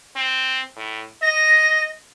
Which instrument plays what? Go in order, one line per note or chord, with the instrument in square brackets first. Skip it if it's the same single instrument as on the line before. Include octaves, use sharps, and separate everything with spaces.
[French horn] C4
A2
[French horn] D#5 [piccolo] A#6